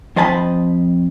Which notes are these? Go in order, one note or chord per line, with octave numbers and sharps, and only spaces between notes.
F2 C5 D#5 A5 B5